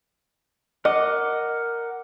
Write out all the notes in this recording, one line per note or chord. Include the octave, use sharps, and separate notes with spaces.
A#4 D#5 F#5 D6